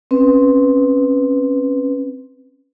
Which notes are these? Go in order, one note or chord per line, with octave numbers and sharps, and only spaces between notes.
C4 C#4 B4